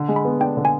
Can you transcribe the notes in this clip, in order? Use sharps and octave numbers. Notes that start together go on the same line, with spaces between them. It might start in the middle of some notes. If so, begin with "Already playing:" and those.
Already playing: D3
G#3
B5
B3
D4 G5
D3
G#5